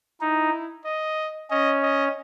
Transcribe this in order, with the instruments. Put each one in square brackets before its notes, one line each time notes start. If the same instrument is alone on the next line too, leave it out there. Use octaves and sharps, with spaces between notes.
[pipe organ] D#4 [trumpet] E4
[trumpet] D#5
[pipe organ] C#4 [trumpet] D#5
[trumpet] D#5